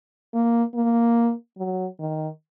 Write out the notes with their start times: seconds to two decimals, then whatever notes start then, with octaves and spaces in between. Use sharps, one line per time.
0.34 A#3
0.75 A#3
1.57 F#3
1.99 D#3